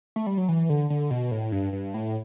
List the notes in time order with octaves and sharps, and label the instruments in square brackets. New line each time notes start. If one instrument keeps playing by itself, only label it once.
[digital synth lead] A3
G3
F#3
E3
D3
D3
B2
A2
G2
G2
A2